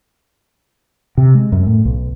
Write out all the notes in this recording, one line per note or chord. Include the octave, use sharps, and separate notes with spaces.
C3
G#3
F#2
A2
B1